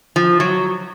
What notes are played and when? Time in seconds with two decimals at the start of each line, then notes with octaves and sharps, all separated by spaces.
0.16 F3
0.40 F#3